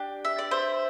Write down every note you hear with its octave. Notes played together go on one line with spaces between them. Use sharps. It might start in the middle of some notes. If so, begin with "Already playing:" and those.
Already playing: D4 G4
E5
D5
C5 E5